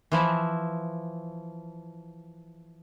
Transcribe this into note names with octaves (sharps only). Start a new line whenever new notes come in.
E3 F3 E4